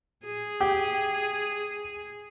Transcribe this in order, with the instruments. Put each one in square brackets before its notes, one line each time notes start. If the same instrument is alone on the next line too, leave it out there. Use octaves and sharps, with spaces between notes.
[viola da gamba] G#4
[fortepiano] G4